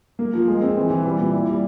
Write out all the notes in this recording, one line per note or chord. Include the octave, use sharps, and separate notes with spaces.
A#3
F3
G#3
C4
E3
E3
G3
A#2
E4
G3